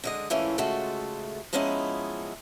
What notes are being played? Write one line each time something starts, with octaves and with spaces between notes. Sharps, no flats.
D3 G#3 D#5
G#2 E3 A3 C#4 E4 F4
C#3 G#3 A3 F4 F#4 A4
F3 G#3 B3 C#4 D#4 E4